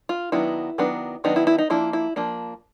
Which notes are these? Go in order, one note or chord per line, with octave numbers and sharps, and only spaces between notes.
F4
D#3 F#3 B3 D4 E4
D#3 F#3 B3 D4
D#3 F#3 B3 D4 D#4
E4
E4
D#4
F3 A#3 D4 E4
E4
F3 A#3 D4